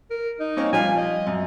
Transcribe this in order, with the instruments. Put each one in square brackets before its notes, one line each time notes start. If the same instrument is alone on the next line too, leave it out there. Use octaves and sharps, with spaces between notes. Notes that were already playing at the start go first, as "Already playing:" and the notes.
[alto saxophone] A#4
D#4
[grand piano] A#3 C4 C#4
[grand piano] F3 G3 F4 [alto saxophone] G#5
[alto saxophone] D#5
[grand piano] F#2